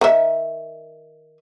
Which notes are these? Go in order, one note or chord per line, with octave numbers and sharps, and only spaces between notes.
D#3 E5